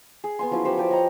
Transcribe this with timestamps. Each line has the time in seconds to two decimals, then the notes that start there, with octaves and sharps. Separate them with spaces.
0.24 G#4
0.39 B3 G#5 C6
0.51 F3 F#3 C#4 E4
0.64 F#4 G4 C5 B5
0.77 F3 G4 D5
0.89 C#5 D#5 A#5